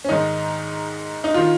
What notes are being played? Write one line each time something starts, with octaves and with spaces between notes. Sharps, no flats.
C#4
G#2 D#3 D#4
D#4
D#3 F4